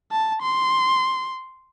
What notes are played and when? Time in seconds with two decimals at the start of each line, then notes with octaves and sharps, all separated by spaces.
0.12 A5
0.42 C6